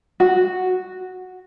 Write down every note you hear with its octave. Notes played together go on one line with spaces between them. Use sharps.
F#4